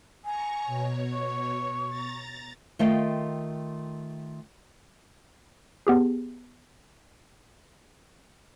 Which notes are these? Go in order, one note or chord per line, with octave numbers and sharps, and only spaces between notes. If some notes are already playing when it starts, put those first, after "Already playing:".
G#5 A#5 C#6
B2 C#5
C#6
A#5 A6
D#3 A3 F4 D#5 F5 G5
B3 G4 G#4